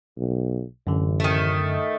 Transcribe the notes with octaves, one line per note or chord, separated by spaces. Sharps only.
B1
A1 F#2 D3
D#3 A3